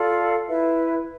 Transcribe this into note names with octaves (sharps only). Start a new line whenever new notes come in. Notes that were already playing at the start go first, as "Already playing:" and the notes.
Already playing: F4 A4 D5 F5
E4 B4 E5